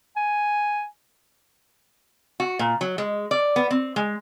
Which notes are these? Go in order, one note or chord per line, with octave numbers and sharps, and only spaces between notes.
G#5
F#4
A#2
F#3
G#3
D5
B3
C4
G#3